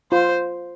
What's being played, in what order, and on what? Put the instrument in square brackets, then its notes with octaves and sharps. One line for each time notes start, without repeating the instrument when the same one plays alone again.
[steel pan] F4 [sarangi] C5